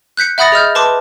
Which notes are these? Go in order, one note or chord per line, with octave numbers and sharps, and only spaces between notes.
F#6 G6 B6 C#7
E5 F#5 B5 D#6 A6 A#6
G#4 D#5 F6 G6
B4 A5 C6 D6